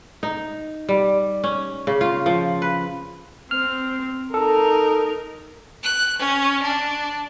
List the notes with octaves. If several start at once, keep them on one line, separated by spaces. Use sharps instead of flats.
D#4
G3
C#4
C#3
F4
F3
B4
C4 F6
D#4 A4 A#4
F#6
C#4
D4